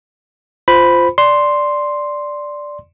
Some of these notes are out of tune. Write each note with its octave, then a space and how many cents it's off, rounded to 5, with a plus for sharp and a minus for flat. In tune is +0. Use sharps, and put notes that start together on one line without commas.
F4 +0 C5 -15 B5 +0
D5 +0 C6 +0